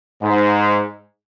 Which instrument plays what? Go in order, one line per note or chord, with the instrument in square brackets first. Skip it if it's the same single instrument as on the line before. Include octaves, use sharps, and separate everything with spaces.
[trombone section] G#2